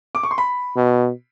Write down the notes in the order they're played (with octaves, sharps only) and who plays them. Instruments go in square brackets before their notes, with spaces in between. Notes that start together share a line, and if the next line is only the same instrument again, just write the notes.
[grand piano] D6
C#6
C6
B5
[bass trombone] B2